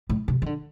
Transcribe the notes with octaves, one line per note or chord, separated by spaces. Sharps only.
A2
C3
D#3
D3